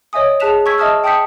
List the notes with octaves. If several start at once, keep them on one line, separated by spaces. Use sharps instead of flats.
C#5 D#5 E5 G#5 D#6
G#4 A5 F#6 B6 E7 F7
G#5 C#6 E6 G#6 B6
D#5 E5 A5 D#6 F6
G5 A5 D#6 G6 B6 C#7